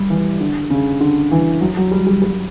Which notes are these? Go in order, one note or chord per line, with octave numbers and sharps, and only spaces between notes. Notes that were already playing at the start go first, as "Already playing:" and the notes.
Already playing: G3
E3
D3
C#3
D3
E3
F#3
F#3
G3
G3
G3